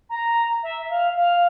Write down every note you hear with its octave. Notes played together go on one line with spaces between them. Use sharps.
A#5
E5
F5
F5